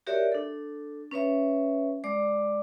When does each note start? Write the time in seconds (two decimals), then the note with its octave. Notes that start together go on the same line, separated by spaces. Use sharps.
0.07 F#4 G4 A#4 C#5 D5 E5
0.32 D4 A4
1.11 C#4 B4 C#5 E5
2.04 G#3 D5 D6